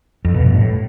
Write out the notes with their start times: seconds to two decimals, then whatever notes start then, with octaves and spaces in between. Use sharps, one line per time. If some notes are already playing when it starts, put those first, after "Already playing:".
0.25 F2
0.34 B2
0.44 G2
0.54 A2